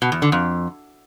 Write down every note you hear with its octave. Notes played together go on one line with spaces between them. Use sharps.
B2
E2
D3
F2